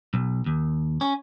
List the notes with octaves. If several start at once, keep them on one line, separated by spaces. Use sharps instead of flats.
B1
D#2
C#4